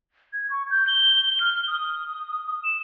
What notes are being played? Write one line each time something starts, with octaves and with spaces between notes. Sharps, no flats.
G#6
C#6
G6
G7
F6
D#6
E7